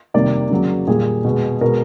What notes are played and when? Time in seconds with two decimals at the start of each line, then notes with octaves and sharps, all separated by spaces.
0.14 C3 D#3 G3 A#3 D5
0.50 C#3 F#3 A#3
0.87 A#2 G3 A#3 G#4
1.24 B2 G#3
1.61 B2 G#3 A#4